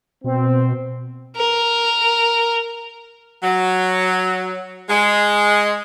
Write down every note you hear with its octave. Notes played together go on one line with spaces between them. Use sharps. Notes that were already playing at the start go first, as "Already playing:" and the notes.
B2 C4
A#4
F#3
G#3